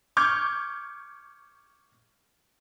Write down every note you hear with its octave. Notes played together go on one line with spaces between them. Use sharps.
C#6 D6 F6 G6 G#6